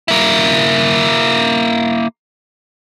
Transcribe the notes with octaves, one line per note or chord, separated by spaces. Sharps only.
A#3 E4